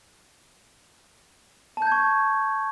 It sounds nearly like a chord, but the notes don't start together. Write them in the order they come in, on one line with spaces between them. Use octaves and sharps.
A5 G6 G#6 C#6